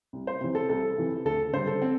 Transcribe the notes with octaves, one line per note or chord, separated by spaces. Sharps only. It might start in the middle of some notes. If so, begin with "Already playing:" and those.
C2
C5
C3 E3
A4
C2 A4
C3 E3
D2 A4
D3 G3 C5
A4
C4